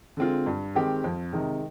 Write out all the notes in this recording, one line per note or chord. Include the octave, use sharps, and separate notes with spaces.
D3 G#3 C4 F4
G2
D#3 G#3 C4 G4
F2
C3 D#3 G#3 D#4